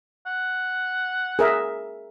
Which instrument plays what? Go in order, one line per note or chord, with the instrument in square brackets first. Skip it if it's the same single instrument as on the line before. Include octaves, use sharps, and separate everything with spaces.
[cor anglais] F#5
[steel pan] G#4 A#4 E5